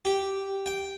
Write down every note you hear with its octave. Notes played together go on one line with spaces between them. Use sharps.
G4
G5